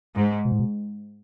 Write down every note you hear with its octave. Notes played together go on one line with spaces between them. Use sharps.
G#2
B2
A2
B2